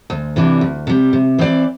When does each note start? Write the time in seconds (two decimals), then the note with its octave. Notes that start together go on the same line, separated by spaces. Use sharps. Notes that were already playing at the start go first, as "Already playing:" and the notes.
0.10 D2
0.36 C3 E3 G3 D4
0.61 D2
0.87 C3 G3
1.13 C3
1.38 E3 C4 G4 D5